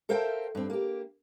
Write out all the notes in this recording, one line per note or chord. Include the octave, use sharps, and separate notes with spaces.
A4 A#4 C5 E5 F5 G5
G2 C4
A#3 G4